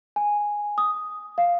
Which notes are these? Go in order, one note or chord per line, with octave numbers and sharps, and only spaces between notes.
G#5
D#6
F5